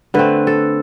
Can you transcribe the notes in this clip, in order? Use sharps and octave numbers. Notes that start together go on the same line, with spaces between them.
D3 A3 C4 B4
A4